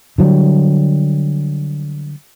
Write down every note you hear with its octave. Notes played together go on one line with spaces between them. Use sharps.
D3 F#3 G3